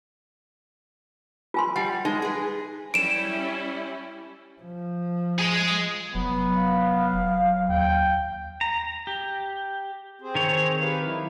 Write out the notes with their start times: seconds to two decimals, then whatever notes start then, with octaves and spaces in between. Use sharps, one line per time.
1.54 F4 G#5 C6
1.76 G3 F#5
2.05 G#3 D#4
2.22 G#4 B4
2.94 G3 C#4 E4 D7 E7
4.62 F3
5.39 G#3 G#4
6.15 F1 F#3 B3
6.54 F5
7.69 D#2 G5
8.61 A#5
9.07 G4
10.22 C4 G#4 C5
10.35 D#3 C#5
10.81 G4 B4 F5
11.04 F#3 E4